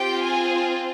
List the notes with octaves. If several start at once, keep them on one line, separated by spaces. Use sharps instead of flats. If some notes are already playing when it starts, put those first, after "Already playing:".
Already playing: C4 F4 G4 G5
G#4 G#5